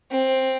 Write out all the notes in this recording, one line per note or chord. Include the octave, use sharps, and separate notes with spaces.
C4